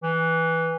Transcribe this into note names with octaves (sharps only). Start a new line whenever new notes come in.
E3